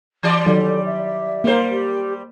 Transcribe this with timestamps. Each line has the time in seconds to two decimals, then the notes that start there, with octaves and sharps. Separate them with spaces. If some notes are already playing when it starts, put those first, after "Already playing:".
0.23 E3 G3 D5
0.46 D#3 F#3 A4
0.86 E5
1.44 G3 A#3 A#4 C5
1.70 G4